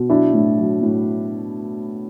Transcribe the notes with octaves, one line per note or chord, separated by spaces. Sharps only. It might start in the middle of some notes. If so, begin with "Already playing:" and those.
Already playing: B2
F#3 D4 E4
A2
F#3
A2